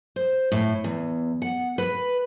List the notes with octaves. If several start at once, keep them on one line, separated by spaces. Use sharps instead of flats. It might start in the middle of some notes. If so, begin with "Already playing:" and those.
C5
A2
E2
F#5
B4